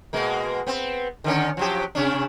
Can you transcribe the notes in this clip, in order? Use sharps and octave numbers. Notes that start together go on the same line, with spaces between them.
B2 G#3 A#3
B3 C4
D3 D#3 C#4
F3 F#3 G4
C3 C#4 D4